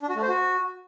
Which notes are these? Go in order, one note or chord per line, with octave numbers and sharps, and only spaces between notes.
D4
F#4
A3
C5
F#4